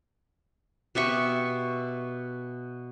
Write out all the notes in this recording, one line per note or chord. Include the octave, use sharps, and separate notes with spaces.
B2 G4 E5 C#6